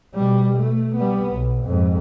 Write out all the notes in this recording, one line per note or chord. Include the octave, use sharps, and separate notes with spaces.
B2 G3
A3
G3 B3
B1
F2 G#2